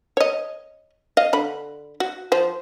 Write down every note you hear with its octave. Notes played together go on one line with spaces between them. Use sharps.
C#5 D#5
D#5 F5
D3 B5
F#4
F3 C5